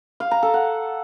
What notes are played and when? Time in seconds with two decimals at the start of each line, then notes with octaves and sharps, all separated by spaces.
0.20 F5
0.31 A#5
0.43 A4
0.54 F#5